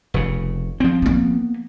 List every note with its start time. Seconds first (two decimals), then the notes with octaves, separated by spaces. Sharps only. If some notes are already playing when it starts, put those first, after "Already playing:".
0.14 F1 C#3
0.80 F3 C4
1.02 A#3 B3